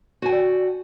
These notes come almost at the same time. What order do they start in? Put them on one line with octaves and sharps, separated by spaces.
F#4 G#5 G5 D5